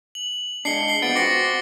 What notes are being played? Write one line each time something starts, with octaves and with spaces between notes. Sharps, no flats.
F#7
G#3 D4 C7 C#7 G7
C7 G7
F3 B3 A6 D7
C4 F#4 D6 A#6 C#7